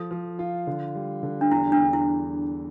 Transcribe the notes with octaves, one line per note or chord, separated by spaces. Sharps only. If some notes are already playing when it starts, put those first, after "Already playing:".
Already playing: F3 A4
F3
F4
D3
G3
D3
D4
E2 E4
D4
E2
E4